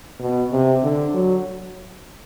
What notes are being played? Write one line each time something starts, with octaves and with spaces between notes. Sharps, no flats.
B2
C3
D3
F#3